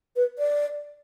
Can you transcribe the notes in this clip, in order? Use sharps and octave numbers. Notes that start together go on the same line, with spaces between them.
B4
D5